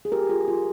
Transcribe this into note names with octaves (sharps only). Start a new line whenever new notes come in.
G#4
F4 G4 A#4
F4 G#4
G3
F4